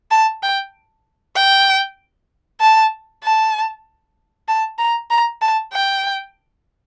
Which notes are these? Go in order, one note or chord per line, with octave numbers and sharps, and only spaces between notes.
A5
G5
G5
A5
A5
A5
A#5
A#5
A5
G5